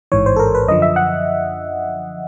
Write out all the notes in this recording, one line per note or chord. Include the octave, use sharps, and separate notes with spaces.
A1 G#2 E3 C#5
C5
A4
A#4
B4
F#2 D3 F3 D#5
E5
F#5